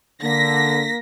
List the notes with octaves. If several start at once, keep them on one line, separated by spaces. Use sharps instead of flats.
D3 A#3 A#6 B6